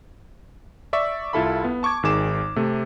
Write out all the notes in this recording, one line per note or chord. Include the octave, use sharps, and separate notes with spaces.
D5 E5 C#6
C2 E4 F4 A4 E5 B5
B3
A5 C#6 D6 G#6
G#1 D#3 G#4 D6 E7
C3 A3